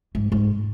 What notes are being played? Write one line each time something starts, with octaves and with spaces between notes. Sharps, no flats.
G#2
G#2